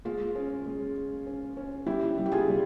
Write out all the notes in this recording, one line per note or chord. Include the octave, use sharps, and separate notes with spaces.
G#3 F4
C#4
G#3
G#3
C#4
C#4
G3 E4 G4
G3
G4
F4 G#4
G3